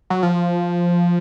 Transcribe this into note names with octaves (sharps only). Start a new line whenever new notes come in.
F#3
F3